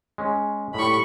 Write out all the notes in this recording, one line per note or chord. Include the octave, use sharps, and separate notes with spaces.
G#3 C#4
A2 G3 B5 C#6